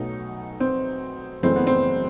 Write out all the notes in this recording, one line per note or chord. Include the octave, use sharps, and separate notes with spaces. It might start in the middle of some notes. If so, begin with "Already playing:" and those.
Already playing: B1 B2 F#3 A3 D#4
C4
F#1 F#2 E3 A3 C4
B3
C4